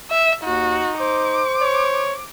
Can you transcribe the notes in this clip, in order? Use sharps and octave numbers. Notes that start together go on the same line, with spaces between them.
E5
D#2 D#4 F#4
C5 D6
C#5